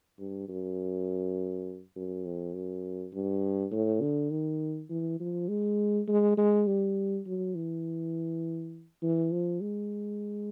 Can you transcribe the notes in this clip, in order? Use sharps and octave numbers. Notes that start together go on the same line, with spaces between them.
G2
F#2
F#2
F2
F#2
G2
A2
D3
D#3
E3
F3
G#3
G#3
G#3
G3
F#3
E3
E3
F3
G#3